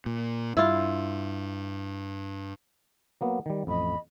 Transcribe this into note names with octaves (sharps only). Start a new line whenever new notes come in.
A#2
G2 E4 F4
F#3 A#3 B3
D#3 G3
A1 F2 D#5 B5